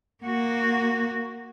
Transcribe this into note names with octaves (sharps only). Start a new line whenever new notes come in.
A#3 F#4